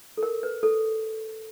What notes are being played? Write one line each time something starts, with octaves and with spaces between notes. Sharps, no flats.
A4
A#4
B4
A4